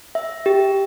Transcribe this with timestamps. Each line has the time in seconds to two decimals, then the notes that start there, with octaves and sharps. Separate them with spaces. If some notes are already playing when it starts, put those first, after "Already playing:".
0.15 E5
0.46 G4